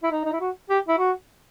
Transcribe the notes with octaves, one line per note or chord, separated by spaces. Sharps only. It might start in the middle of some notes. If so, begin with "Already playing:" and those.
E4
D#4
D#4
E4
F#4
G4
E4
F#4